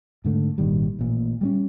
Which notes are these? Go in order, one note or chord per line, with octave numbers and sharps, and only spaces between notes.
G#2 D3 A3
G#1 A#2 D#3 G3
A1 A#2
G3 G#3 C#4